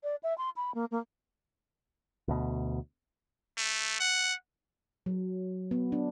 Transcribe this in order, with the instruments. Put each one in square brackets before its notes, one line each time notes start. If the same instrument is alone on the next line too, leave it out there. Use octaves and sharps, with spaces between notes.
[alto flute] D5
E5
C6
B5
A#3
A#3
[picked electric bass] D2 B2
[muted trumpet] A3
F#5
[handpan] F#3
B3
D4